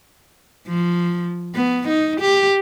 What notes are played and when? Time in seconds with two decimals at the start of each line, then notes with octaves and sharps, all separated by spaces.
0.67 F3
1.55 B3
1.88 D#4
2.21 G4